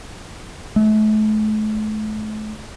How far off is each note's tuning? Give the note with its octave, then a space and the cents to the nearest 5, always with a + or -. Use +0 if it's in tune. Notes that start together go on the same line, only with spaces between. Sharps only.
A3 -40